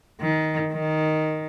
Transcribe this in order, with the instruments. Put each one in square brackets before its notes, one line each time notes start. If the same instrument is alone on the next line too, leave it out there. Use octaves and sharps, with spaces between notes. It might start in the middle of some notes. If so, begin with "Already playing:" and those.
[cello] D#3
D#3